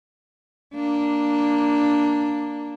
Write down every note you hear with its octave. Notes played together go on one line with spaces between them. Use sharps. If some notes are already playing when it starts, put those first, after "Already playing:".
A#3 D4